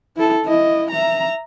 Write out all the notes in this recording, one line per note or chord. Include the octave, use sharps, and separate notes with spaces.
E4 A4
E4 D#5
E5 A#5